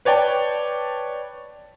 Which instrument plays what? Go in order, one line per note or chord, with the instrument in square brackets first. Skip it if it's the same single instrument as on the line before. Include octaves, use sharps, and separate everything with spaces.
[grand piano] B4 C#5 D5 G5 A5